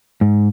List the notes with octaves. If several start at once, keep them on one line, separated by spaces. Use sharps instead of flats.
G#2